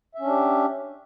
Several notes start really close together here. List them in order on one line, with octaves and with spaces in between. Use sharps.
E5 C#4 D4 G4